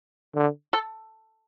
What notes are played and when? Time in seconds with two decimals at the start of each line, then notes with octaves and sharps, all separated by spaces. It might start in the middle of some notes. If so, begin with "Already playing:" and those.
0.35 D3
0.73 A4